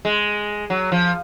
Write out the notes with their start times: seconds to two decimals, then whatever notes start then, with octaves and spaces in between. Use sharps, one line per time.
0.05 G#3
0.70 F#3
0.92 F3